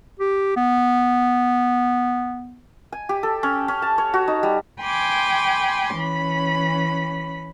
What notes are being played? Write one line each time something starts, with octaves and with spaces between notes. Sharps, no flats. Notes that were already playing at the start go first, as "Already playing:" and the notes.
G4
B3
G#5
G4
A4
C#4
C#4
A5
C#5
F#4
D#4
G3
G5 G#5 B5 C6 D6
E3 C#4 B5